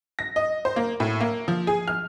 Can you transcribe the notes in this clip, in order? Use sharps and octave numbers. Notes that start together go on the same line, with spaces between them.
A#6
D#5
C5
A#3
A2
A#3
F3
G#4
F6